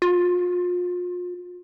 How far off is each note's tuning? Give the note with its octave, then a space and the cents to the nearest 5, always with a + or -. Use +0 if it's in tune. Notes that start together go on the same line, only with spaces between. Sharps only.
F4 +35